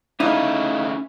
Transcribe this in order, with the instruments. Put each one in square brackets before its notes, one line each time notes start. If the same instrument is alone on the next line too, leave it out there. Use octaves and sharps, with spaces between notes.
[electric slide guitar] A3 C#4 F5 [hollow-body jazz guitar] D#4 E4